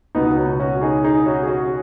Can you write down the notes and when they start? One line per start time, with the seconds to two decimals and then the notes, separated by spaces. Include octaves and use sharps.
0.15 C#2 B2 B3 D#4
0.37 C#4 F#4
0.60 C#4 F#4
0.82 D#4 G#4
1.04 D#4 G#4
1.26 C#4 F#4
1.43 G#4
1.48 C#4 F#4